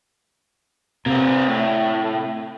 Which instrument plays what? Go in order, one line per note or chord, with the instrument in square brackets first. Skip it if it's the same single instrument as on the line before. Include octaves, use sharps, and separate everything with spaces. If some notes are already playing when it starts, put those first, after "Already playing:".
[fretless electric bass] C3 [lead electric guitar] A#3 C4
[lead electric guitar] A2